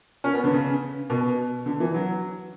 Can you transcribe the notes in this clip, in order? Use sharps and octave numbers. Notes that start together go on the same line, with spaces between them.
C#4
B3
D3
C#3
B2
D3
E3
F#3